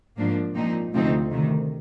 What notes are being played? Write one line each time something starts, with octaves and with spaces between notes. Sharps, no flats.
G#2 F3 A#3 D4
A#2 F3 C4 D#4
D2 C3 F3 C4 D#4
D2 C3 D#3